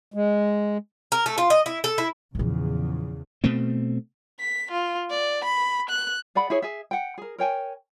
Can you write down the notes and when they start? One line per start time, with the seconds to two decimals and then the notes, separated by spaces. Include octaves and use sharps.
0.14 G#3
1.12 A#4
1.26 A3
1.38 F4
1.50 D#5
1.66 E4
1.84 A4
1.98 E4
2.35 E2 A#2 C#3 F3
3.44 B2 A3 C4
4.40 B6
4.71 F4
5.10 D5
5.44 B5
5.89 F#6
6.35 G#4 D5 F#5 B5
6.50 E4 G#4 C#5
6.62 G#4 E5
6.91 F#5 G5
7.18 G#4 A#4
7.38 A#4 C#5 G5 G#5